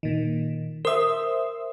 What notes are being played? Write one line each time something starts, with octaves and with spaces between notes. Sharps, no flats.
A#2 D#3
A#4 C5 E5 D#6